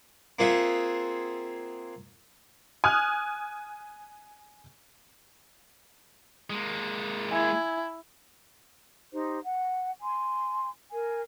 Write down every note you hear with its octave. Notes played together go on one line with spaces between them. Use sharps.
A#3 C4 F4 G#4 E5 F#5
G#5 D#6 F6 F#6
G#3 A#3
E4 G#5 G#6
D#4 G4 C5
F#5
G#5 C6
A#4 G#5